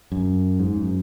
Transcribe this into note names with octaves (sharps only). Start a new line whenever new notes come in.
F#2
G#2
F#2